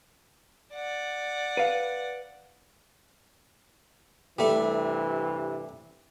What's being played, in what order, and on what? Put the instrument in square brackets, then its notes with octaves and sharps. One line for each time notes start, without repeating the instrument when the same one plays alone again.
[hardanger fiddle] D5 F#5
[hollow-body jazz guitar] B4 F5
[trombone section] G2 C3 E3 [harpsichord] G3 A3